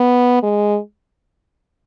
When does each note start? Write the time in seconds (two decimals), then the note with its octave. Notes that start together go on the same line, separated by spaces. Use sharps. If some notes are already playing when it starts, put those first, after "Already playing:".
Already playing: B3
0.43 G#3